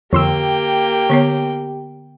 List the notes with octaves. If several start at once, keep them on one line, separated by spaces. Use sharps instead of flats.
F2 D3 A#3 G4 G5 C6 E6
D3 B3 C#5